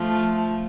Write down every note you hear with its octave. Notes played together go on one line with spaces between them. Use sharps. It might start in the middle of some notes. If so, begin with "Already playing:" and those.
Already playing: F3 A3